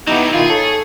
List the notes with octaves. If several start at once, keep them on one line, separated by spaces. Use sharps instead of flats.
D3 F#3 B3 D#4 E4 G4
B2 D#3 E4 F4 G#4
A4 C#5